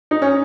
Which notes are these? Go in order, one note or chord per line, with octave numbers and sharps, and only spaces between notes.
D#4
C#4